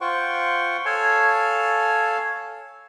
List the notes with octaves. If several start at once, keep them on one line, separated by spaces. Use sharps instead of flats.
F4 C5 F#5 G5 C#6
A4 C#5 F5 G#5 A5